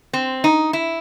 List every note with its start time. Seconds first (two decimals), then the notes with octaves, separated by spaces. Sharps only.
0.13 C4
0.44 D#4
0.73 E4